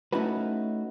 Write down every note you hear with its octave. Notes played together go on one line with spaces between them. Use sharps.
A3 C#4 D#4 E4 F#4 B4